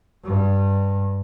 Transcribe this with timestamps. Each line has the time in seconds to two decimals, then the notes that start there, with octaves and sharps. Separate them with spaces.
0.24 G2